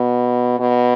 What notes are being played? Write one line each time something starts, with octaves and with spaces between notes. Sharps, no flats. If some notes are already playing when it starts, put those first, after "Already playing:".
Already playing: B2
B2